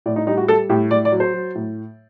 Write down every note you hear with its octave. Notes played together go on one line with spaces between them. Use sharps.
A2 D5
D#4
G3 D#4
F#4
G3 A4
A2 G4
A2 D5
D5
F#3
C5
F#3
A2